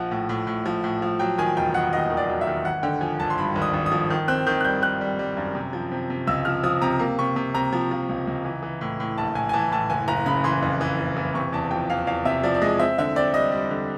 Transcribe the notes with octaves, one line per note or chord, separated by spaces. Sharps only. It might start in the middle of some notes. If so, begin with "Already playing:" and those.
Already playing: A#1 F3 F#5
A2
A2
A2
F3
A2
F3
F#3 G5
D#3 G#5
E1 G5
D#3 F#5
D#2 D#5
D#3
D5
F#3
E5
D#3
G#1 F#5
D3 G5
F3 G#5
G#1 A5
C6
G2 B5
G#1
D#6
G#1
D#6
F3
D#3
C4 F#6
D#3 G6
F#6
G3 G6
D#3 F#6
G3
G3
F#2
C3
F3
C3
C3
C#2 E6
F3 F6
F3 D#6
C3 A#5
A#3
C3 C#6
C3
C3 A#5
F3
F3
C#2
C#2
E3
E3
A2
A2
A#1 A5
A2 G#5
G#5
E3 A5
A2 A5
F#1 G#5
F#1 A#5
C#3 B5
E3 C6
F2
E3
F#1
E3
C3 C#6
E2 A5
F3 G5
E2 F5
E2 F5
C3 E5
F3 D5
D5
G#3 D#5
C4 E5
D3 E5
C4 D5
G3 D#5
G3
D3